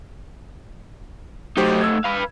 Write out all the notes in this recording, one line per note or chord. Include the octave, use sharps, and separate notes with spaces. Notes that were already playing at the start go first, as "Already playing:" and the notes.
F#3 A3 D#4 G4 C5
E6 G#6
B4 F5